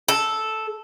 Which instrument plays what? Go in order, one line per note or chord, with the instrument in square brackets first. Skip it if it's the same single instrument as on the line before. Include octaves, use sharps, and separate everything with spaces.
[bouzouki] A4